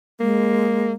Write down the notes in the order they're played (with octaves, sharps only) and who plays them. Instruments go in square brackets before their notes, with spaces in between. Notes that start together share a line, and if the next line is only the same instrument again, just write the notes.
[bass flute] G#3 [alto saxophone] A#3